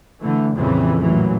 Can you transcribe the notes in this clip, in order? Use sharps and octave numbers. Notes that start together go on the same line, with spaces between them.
D3 E3 A3
A#1 F2 A#2 C#3 E3 G3
A1 A#2 E3 F#3